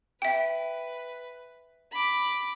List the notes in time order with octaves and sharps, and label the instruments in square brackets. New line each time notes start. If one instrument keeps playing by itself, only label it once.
[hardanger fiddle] B4 [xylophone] E5 G5
[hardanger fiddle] B5 D6